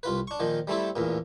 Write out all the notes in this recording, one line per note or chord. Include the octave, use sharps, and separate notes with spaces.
C2 F4 B4
D4 C#6
A#2 D#3 F3
G3 A3 C4 E4 A4
A1 E2 A#2